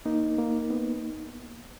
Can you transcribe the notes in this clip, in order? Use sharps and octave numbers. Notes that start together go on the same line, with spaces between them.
A#3 D#4
A#3
B3